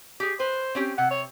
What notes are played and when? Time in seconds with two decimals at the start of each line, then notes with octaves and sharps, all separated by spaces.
0.20 G4 G#4
0.40 B4 C5
0.75 C4 C#4 G4
0.98 C3 F#5
1.11 C#5